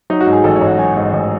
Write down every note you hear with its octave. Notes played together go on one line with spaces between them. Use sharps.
F#3 D#4
F#4
G#2
G#4
A1 A4
C#5
A1
F#5
F#3 G#5
G#2
A1